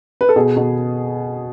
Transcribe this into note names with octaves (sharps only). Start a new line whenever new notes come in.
B4
A4
B2 G#4
B2